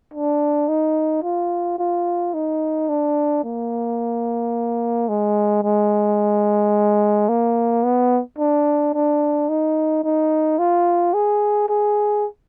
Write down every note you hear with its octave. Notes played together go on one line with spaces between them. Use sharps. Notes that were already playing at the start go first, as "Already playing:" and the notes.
D4
D#4
F4
F4
D#4
D4
A#3
G#3
G#3
A#3
B3
D4
D4
D#4
D#4
F4
G#4
G#4